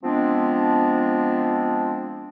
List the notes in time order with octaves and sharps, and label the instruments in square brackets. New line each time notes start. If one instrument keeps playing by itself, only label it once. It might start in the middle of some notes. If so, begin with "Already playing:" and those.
[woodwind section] F3 G#3 B3 C4 D4